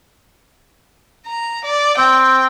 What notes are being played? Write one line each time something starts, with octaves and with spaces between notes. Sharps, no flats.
A#5
D5
C4 G5